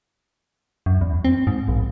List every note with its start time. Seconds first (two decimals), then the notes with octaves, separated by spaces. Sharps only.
0.86 F#2
1.01 E2
1.24 C4
1.47 G#2
1.68 A#1